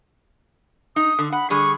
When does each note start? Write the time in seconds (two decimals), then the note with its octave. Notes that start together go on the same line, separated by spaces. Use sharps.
0.96 D#4 D#6
1.19 D3
1.32 F#5 B5
1.50 D3 G3 G#4 C#6